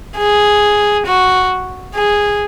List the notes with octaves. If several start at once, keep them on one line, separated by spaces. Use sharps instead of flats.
G#4
F#4
G#4